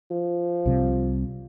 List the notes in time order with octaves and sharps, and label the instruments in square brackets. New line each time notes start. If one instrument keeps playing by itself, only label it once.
[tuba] F3
[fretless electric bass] C2 C3 G3